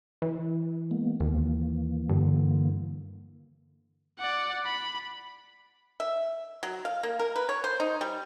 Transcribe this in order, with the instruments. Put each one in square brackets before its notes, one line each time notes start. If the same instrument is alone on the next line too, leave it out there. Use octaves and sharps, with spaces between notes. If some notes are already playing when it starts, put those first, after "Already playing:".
[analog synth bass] E3
[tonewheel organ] G#3 A#3 B3
[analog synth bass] D#2 [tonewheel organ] E3 A#3
[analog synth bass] G2 [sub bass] D3
[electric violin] D5 F#5
B5
[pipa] E5
F#3
F5
A#3
A#4
B4
C#5
C5
D#4
G3